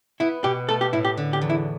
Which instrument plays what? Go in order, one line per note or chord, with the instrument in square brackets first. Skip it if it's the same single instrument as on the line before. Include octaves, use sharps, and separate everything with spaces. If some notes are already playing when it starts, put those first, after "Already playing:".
[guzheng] B3 [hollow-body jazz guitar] E4
[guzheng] B2 [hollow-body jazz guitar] G4
[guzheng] A3 [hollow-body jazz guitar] A4
[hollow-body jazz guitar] G4
[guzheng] A2 [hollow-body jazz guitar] E4
[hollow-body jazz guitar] G4
[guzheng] D3
[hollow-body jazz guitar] G4
[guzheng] E2
[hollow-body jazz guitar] E4